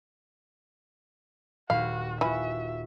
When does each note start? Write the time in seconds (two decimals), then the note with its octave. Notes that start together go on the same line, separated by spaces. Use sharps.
1.70 D#1 F#4 F5 B5
2.21 E3 F4 F#4 E5 G#5 B5